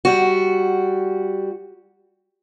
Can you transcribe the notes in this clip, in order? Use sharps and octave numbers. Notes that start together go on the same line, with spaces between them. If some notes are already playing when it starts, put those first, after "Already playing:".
G3 F#4